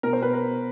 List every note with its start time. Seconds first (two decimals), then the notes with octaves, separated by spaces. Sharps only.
0.03 B2 A#4
0.13 C5
0.22 B4
0.33 A#4